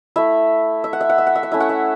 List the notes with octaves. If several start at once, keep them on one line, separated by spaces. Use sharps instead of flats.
A3 E4 E5
E5
F#5
E5
F#5
E5
F#5
E5
F#5
A3 C#4 E4 E5
F#5
E5